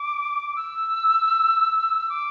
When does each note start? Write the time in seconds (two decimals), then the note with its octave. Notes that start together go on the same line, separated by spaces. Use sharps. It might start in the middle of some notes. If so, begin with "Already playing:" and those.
Already playing: D6
0.56 E6
2.09 D6